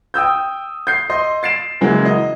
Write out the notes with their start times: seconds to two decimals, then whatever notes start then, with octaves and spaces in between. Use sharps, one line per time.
0.14 G5 D#6 E6 G6
0.87 G6 C7
1.10 D#5 C6
1.43 A6 C7 D7 E7
1.81 C#3 E3 F#3 G#3 A#3
2.05 D#5